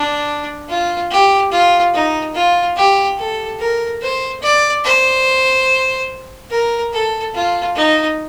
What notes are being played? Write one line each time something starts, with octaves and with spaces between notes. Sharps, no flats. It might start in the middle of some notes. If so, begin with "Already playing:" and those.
Already playing: D4
F4
G4
F4
D#4
F4
G4
A4
A#4
C5
D5
C5
A#4
A4
F4
D#4